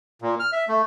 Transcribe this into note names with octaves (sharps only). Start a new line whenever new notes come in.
A#2
F6
E5
A3